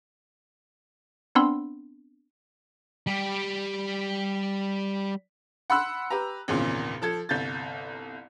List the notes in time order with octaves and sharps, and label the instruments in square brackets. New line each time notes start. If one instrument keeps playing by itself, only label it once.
[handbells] B3 C4 D4 B5 C6 E6
[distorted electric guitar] G3 G4
[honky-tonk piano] F#5 B5 C6 E6 F#6
G4 B4 A#5
G#1 E2 A#2 C#3
F3 A4 G#6
G1 C2 G6 A6